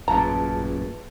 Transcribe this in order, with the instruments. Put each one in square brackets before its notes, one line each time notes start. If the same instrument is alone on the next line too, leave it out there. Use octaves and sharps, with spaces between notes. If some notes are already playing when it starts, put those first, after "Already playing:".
[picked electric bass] A1 F#2 A#2 [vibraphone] F4 G#4 B4 [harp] A5 [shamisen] A#5